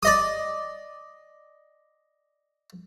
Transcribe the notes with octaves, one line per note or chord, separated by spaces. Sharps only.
D5 D#5 D#6